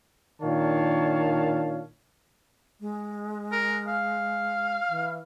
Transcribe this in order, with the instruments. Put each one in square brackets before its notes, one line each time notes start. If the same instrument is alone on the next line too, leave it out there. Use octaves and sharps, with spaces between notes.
[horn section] A#2 D#3 D4 C#5 F5 A5
[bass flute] G#3
[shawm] A#4
F5
[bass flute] E3